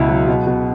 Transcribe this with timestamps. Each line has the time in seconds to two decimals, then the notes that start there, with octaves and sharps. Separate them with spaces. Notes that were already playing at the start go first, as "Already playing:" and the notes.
Already playing: C#2 B2 E4
0.09 F#3
0.28 B2
0.47 B2